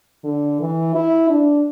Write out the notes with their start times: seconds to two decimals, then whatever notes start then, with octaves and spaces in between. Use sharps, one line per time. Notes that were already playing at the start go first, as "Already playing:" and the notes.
0.24 D3
0.60 E3
0.95 E4
1.30 D4